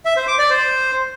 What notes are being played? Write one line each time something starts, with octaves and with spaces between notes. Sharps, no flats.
E5
C5
D6
D5
C5